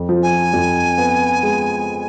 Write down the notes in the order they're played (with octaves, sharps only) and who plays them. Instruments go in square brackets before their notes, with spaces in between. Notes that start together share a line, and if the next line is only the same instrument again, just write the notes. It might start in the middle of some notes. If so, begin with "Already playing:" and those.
Already playing: [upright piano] F2
F3
[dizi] G#5
[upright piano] F2
B3
G#3